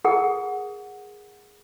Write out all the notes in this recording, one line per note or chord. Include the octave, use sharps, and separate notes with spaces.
G#4 A#4 F#5 D#6